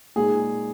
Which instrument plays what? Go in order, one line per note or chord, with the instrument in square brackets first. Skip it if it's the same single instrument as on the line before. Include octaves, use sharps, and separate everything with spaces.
[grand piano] A#2 G#3 D#4 G#4